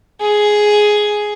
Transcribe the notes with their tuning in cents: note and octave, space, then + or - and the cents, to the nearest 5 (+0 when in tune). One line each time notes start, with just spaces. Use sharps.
G#4 +5